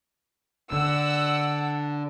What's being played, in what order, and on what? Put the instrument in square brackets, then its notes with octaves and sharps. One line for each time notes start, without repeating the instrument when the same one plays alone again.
[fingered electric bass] D3 [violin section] F#5 E6